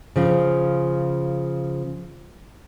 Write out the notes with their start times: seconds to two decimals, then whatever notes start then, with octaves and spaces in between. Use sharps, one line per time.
0.16 C#3 F3